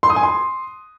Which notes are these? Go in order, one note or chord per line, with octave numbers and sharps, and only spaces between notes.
C6
D#6
G#5
C6